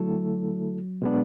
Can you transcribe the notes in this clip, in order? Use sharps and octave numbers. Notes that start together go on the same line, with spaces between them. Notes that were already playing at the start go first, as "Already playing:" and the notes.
Already playing: D3 F#3 A3 E4 A4
B2 G#3 B3 D4